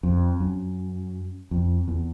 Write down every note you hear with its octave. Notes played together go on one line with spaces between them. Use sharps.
F2
F#2
F2
E2